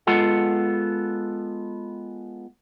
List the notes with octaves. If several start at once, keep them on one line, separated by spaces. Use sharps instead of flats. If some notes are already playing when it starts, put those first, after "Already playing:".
G#3 B3 F4 A4 F#5